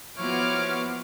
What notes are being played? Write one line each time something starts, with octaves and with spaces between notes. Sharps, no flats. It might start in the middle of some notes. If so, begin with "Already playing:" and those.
F3 B3 E4 F#4 C#5 D6 F6